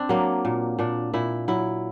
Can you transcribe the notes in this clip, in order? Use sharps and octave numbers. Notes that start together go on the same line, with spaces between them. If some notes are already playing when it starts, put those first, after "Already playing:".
Already playing: C4 D4
F#3 A#3
A#2
A#2 D4
A#2 E4
F#3 E4